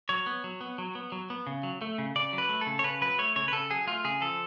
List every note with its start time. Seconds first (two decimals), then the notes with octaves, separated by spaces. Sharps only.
0.09 F#3 C#5
0.26 B3
0.44 F#3
0.61 B3
0.78 F#3
0.95 B3
1.12 F#3
1.30 B3
1.47 C#3
1.63 F#3
1.81 A3
1.98 C#3
2.16 C#3 D5
2.33 F#3
2.38 B4
2.49 A3
2.61 A4
2.67 C#3
2.79 C#5
2.84 C#3 B4
3.01 F#3 B4
3.18 A3 C#5
3.36 C#3 C#5
3.48 B4
3.52 C#3 A4
3.70 F#3 G#4
3.87 A3 F4
4.04 C#3 G#4
4.21 F3 A4